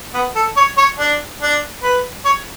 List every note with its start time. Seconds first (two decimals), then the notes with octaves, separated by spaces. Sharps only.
0.14 B3
0.35 A4
0.57 C#5
0.77 C#5
0.98 D4
1.41 D4
1.83 B4
2.25 C#5